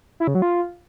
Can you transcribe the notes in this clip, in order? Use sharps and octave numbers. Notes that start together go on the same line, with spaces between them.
E4
C#3
F#3
F4